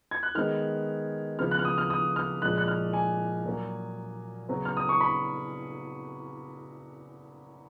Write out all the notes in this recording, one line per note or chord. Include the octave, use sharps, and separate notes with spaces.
G#6
F#6
D#3 G#3 B3 F6
C#3 F3 B3 F6
F#6
F6
D#6
F6
D#6
F6
A#2 F3 G#3 F#6
F#6
F6
G#5
A#2 F#3 A#3
C#3 F#3 B3
F6
D#6
C#6
B5